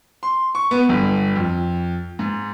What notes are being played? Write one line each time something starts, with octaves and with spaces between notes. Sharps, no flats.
C6
C#6
B3
G1
F2
G#2